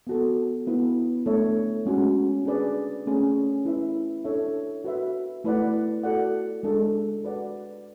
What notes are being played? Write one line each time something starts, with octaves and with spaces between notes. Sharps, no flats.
B3 F#4 A4
B3 E4 B4
A3 D4 A4 C#5 E5
G#3 C#4 F#4
D4 G#4 B4 D5
A3 C#4 G#4
E4 B4 E5
D4 A4 C#5 E5
F#4 B4 E5
A3 E4 B4 D5 F#5
F#4 A4 D5 F#5
G#3 D4 A4
F#4 B4 D5 F#5